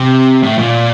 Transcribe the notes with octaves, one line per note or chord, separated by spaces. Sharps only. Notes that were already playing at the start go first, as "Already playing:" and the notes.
Already playing: C3
A2
A#2